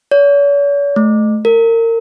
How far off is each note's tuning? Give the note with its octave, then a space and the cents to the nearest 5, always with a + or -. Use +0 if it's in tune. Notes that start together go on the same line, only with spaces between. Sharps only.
C#5 +45
A3 -25
A#4 -30